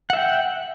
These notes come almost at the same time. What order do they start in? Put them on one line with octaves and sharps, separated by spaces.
F#5 E5 G5